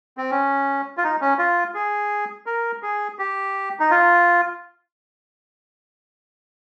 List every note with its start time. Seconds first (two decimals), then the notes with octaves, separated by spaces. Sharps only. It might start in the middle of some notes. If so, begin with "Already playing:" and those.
0.17 C4
0.31 C#4
0.97 F4
1.04 D#4
1.21 C#4
1.39 F4
1.74 G#4
2.46 A#4
2.83 G#4
3.19 G4
3.80 D#4
3.91 F4